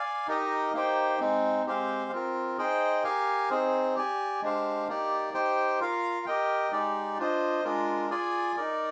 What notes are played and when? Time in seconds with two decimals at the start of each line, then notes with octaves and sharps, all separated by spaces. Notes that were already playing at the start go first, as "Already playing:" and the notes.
Already playing: D5 F5 G#5
0.27 D#4 G4 A#4 D#5
0.74 A#3 D#4 G4 C5 G5
1.20 G#3 C4 D#4
1.66 G#3 C4 G4 C5 F5
2.11 C4 F4 A#4
2.58 D#4 G#4 C5 D#5 G5
3.04 G4 A#4 F5 G#5
3.50 C4 D#4 G#4 C5
3.95 G4 D5 G#5
4.42 G#3 D4 G4 C5 F5
4.88 A#3 D#4 G4 D5
5.33 D#4 G4 C5 G5
5.80 F4 A#4 F5
6.26 G4 A#4 D#5 G5
6.72 G#3 D#4 G4 D5
7.18 D4 F4 C5 D#5
7.64 G#3 D4 F4 A#4
8.10 F4 G#4 D5 G#5
8.56 D#4 A#4 D5